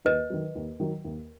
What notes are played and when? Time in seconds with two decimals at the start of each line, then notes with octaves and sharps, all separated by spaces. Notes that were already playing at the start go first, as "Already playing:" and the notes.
0.05 D#2 B4 D#5
0.30 D#3 F#3
0.55 D#2
0.80 D#3 F#3
1.05 D#2